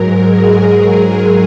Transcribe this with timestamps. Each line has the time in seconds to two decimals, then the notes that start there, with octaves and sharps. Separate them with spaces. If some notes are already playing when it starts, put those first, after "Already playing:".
Already playing: G#2 F#3 A#4
0.23 G#4
0.96 A#4